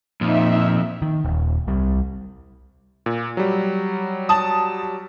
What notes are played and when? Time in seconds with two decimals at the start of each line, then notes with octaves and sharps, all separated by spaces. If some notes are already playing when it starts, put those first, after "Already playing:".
0.21 F2 A#2 D#4 E5
1.02 D#3
1.25 D#1
1.68 C2 G3
3.06 A#2
3.37 F#3 G3
4.29 A5 D#6